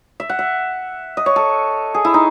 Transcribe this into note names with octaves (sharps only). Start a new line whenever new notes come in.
E5
F#5
E5
D#5
C#5
A4
G#4
E4
D#4